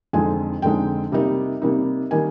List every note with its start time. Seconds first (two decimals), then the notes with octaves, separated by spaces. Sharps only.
0.13 F2 D3 G#3 C4 D#4 G#5
0.62 F2 D3 G#3 C4 D#4 G5
1.12 C3 G3 A#3 D#4
1.62 C3 G3 A#3 D#4
2.11 D#3 G3 A#3 D#4 G#5